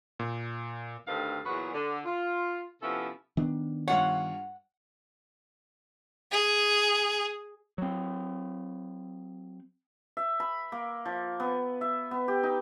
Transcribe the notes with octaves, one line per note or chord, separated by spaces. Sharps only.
A#2
D2 G2 D#3 C4 A4 F5
E2 A#2 F#3 F#4 G#4 B4
D3
F4
C3 F3 B3 C#4 E4 A4
D#3 B3 D4
G2 F4 C#5 F#5
G#4
F#3 C4
E5
B5
A#3
F3
B3
E5
B3
G4
D#4